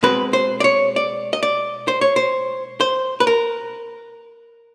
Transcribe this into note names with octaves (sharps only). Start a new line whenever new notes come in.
B2 G#3 C4 B4
C5
D5
C#5
D5
D#5
D5
C5
C#5
C5
C5
B4
A#4